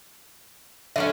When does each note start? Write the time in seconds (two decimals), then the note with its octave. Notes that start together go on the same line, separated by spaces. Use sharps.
0.96 D3 F#3 C#4 E5